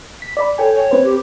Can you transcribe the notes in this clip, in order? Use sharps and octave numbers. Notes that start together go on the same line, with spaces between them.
B6
D5 B5
A4 C#5 G5 G#5
C#5
C4 B4 C5
G4